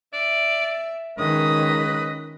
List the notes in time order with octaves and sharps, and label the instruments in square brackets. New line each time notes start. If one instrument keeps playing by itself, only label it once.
[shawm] D5 [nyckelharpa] E5
[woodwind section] C#2 G#3 D#5 [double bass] D#3 [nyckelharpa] C#4 D#6 [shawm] B4